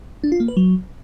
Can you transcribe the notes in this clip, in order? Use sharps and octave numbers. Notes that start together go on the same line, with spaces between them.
D4
F4
A#3
B4
F#3